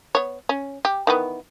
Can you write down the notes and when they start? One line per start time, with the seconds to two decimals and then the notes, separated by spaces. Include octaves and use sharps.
0.15 B3 C#5
0.49 C#4
0.85 G4
1.07 D#3 E3 B3